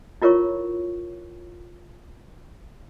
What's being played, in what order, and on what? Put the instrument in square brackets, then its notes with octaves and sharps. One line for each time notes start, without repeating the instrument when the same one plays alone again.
[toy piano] E4 F4 A#4 C#5 C#6